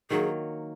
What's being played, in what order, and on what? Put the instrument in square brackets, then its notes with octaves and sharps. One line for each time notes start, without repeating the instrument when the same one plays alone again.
[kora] D#3 F#3 A#3 [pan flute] G#4